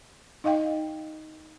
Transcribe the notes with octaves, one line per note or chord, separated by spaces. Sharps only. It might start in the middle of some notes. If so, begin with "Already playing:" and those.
D#4 D#5 F5 G5